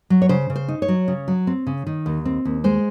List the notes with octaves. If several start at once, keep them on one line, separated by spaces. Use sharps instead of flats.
F#3
C#5
C#3 C5
C#3
C5
D#4
C#5
F#3
C#3
F#3
C4
C#3
D#3
D#2
C4
D#2
G#3 C5